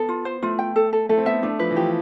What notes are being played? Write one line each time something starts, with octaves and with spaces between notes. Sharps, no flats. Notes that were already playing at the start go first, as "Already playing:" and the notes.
Already playing: B3 A4
F4
C5
A3 F4
G5
A4
A4
A3 A4
C4
B3 E5
A3 D4
F3 B4
E3
F3 G4